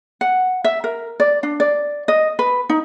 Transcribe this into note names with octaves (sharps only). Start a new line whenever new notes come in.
F#5
E5
A#4
D5
D4
D5
D#5
B4
D#4